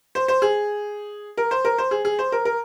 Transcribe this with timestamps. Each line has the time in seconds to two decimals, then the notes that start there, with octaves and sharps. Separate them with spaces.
0.15 C5
0.28 C5
0.42 G#4
1.37 A#4
1.51 C5
1.65 A#4
1.78 C5
1.91 G#4
2.05 G#4
2.19 C5
2.32 A#4
2.45 A#4